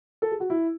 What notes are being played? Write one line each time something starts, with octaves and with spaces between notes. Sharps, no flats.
A4
G#4
F#4
E4